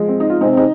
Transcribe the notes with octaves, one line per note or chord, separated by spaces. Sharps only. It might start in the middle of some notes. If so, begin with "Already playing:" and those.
Already playing: F3 G#3
C4
D#4
F4
C3 G#3 C4 D#4
D#4